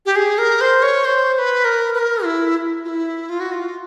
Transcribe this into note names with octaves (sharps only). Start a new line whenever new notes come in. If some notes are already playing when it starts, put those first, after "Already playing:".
G4
G#4
A#4
C5
C#5
C5
C5
B4
A#4
B4
A#4
E4
F4
E4
F4
F#4
F4